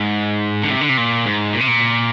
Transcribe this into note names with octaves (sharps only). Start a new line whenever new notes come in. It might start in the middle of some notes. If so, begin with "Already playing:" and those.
Already playing: G#2
D3
C3
D3
C3
A#2
G#2
A#2
C3
A#2